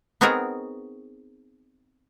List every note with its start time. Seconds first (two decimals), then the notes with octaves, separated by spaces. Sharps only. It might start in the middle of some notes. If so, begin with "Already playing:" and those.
0.21 B3 C4 D#4 F#4 G#4 A#4